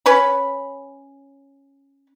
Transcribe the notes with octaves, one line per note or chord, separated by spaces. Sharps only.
C#4 B4 C#5 B5